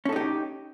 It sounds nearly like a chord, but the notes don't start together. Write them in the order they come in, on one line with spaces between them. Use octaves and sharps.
C#4 A4 D#4 G4